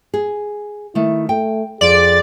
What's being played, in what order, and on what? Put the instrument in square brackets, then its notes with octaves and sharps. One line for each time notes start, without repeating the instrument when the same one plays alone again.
[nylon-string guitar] G#4
[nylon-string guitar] D#3 A3 [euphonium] E4
[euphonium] A3 [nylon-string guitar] G5
[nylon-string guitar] F2 [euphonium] G#4 [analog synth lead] D5